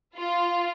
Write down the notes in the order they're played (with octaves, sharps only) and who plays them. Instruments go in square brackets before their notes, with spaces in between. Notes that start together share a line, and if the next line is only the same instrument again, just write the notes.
[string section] F4